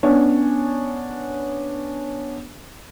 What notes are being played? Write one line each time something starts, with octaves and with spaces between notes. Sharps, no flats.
B3 C#4 D4 C#5